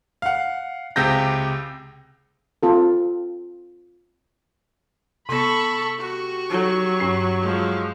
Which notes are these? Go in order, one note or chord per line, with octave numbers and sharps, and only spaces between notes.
F5 F#5
C#2 C3 G4 G6 A#6
C4 F4 A4
C3 B3 A4 B5 C#6
F#4 G4 C#6
F#3 D#4 A4
G2 C#4
F3 G#3